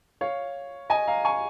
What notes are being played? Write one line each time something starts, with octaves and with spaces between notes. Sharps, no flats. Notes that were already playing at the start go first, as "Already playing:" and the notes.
C#5 F5
D#5 G#5
F5 A#5
G#5 C#6